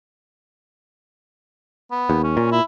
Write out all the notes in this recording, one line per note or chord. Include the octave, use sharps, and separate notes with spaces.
B3
D#2
C#4
A#2
E4